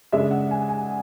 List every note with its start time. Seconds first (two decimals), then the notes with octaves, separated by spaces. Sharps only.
0.12 C#3 G#3 D4 E5
0.31 F#5
0.51 G#5
0.69 G#5